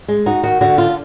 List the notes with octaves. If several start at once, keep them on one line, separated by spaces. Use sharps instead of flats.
G#3
D#4 F#4
D#3 F#4
D3 F#4
D4 F4